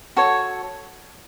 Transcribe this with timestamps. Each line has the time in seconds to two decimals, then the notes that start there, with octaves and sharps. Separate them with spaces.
0.16 F#4 A4 C#5